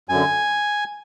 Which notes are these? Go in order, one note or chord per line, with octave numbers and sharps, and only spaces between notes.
F#2 G#5
D3